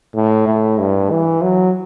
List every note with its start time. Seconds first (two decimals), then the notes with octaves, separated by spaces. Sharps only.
0.16 A2
0.47 A2
0.79 G2
1.11 E3
1.42 F#3